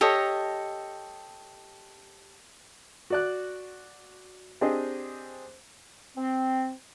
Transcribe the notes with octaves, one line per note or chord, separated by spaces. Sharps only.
G4 A4 C#5 D#5
F#4 D5 F#6
C4 D4 G4 G#4 C5 D#5
C4